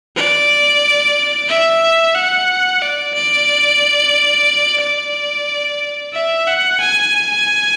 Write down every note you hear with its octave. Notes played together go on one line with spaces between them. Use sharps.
D5
E5
F#5
D5
D5
D5
E5
F#5
G#5